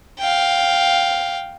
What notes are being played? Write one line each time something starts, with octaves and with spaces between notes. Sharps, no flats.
F5 G5